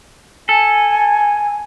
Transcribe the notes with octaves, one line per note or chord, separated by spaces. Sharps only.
A4 G#5